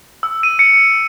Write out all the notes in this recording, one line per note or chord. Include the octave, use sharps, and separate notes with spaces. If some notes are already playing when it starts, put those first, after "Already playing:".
E6
D#7
C#7